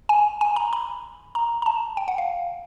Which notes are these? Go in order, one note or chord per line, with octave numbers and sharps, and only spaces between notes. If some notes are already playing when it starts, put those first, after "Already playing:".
G#5
G#5
A#5
B5
A#5
A#5
A5
G5
F#5
F5